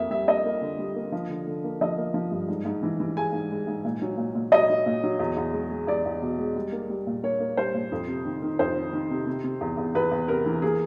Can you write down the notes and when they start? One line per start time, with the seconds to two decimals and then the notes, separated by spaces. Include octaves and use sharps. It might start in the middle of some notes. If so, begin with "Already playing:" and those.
Already playing: F2 A#3 E5
0.10 G3 E5
0.27 A#3 D#5
0.45 A#3
0.62 D3
0.79 G3
0.95 A#3
1.12 F3
1.29 D3
1.47 D3
1.64 A#3
1.81 F3 D#5
1.97 A#3
2.14 F3
2.31 G2
2.48 G#2
2.65 G#2
2.82 E3
3.00 E3
3.16 G#3 G#5
3.33 G#2
3.51 G#3
3.67 G#2
3.85 A#2
4.02 F#3
4.17 A#2
4.35 A#2
4.52 F#3 D#5
4.69 F#3
4.86 A#2
5.03 F#3
5.19 E2
5.36 E2
5.53 G#3
5.70 G#3
5.87 E2 D5
6.05 E2
6.22 B2
6.38 G#3
6.56 G3
6.72 A#3
6.90 G3
7.07 A#2
7.23 A#3 C#5
7.40 A#3
7.57 G3 C5
7.74 A#2
7.92 F2
8.08 C3
8.25 D#3
8.42 D#3
8.59 F2 C5
8.76 D#3
8.93 D#3
9.10 C3
9.26 C3
9.44 C3
9.61 E2
9.77 E2
9.95 E2 B4
10.11 E2
10.28 C3 A#4
10.46 E3
10.62 A#3 G#4